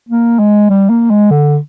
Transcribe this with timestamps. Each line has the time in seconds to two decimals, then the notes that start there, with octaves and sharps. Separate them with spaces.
0.09 A#3
0.39 G#3
0.70 G3
0.90 A#3
1.10 G#3
1.31 D3